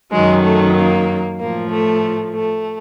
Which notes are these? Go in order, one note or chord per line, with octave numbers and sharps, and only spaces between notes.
F#2 D#3 F#3 G#3
A3
A#3
A2 F3 A#3
A3
A3